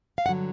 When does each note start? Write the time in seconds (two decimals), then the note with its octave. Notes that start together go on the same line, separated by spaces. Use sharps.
0.18 F5
0.26 G2 D3 F#3 F#5